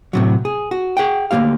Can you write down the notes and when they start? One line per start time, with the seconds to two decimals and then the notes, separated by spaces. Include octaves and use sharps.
0.13 A2 C3 F#3
0.45 G#4
0.71 F#4
0.97 G#4 F#5 G5
1.31 D2 E3 A#3 G4 F5